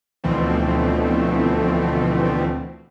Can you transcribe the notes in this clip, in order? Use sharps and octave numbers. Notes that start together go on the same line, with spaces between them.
D2 B2 E3 F3 A3 C4